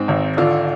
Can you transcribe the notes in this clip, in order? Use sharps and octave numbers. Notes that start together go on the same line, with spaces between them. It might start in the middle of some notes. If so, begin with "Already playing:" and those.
Already playing: G#2 C4 D#4
G#1
D3 D4 F4